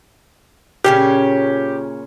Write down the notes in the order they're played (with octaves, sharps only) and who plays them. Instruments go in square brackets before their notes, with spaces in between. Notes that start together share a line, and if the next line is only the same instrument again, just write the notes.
[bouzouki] A#2 C#3 C#4 [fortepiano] G4